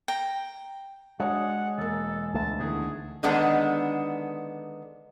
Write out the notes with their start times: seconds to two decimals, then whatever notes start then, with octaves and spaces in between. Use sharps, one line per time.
0.08 G5 A#5
1.20 G#3 D4 F#4 C#5 F#5
1.78 E1 A#3 A4
2.34 D2 A3 A5
2.59 E2 D3 D#3 G#4
3.23 D3 D#3 G#3 B3 D4 A4